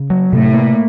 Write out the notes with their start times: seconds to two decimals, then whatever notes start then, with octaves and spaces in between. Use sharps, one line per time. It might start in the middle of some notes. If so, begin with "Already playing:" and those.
Already playing: C#3
0.10 F#3
0.32 A2 C3
0.54 A#3